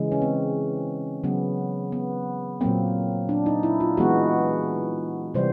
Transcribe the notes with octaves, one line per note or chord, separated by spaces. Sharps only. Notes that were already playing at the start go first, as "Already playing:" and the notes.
Already playing: C#3 E3 G#3
C#4
C4
C#3 F#3 B3
B3
A#2 F#3 A#3 C4
D4
D#4
E4
F4
E3 G#3 B3 F#4
C3 E3 G3 C5